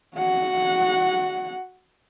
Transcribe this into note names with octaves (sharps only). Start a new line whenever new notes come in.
F#4 F#5